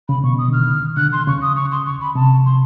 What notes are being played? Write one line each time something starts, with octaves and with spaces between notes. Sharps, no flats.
C#3 B5
B2 C#6
D#6
D3
D#3 F6
D3 F#6
C6
C#3 C#6
D#6
C#6
C6
C#6
B5
C3 A5
C6